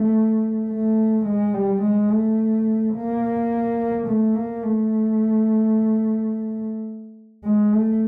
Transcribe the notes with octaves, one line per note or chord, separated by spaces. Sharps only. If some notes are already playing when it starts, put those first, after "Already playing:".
Already playing: A3
A3
G#3
G3
G#3
A3
A#3
A3
A#3
A3
G#3
A3